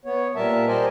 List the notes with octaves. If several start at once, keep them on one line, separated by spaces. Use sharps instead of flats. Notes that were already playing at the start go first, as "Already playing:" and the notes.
B3 C#5
A#2 G3 A#4 E5 A5
G4 A#4 C5 D5 D#5 G#5